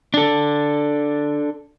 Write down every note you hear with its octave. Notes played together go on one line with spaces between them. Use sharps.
D4 A4